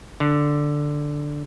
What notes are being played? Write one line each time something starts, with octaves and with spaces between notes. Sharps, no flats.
D3